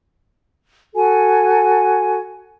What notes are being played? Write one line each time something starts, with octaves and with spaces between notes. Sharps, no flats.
F#4 A4 G#5